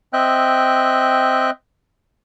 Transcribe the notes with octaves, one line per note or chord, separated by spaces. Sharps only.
C4 D#5 E5 G5 F#6